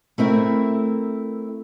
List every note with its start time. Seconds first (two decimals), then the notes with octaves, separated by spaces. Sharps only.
0.18 A3 C4 E4 A#4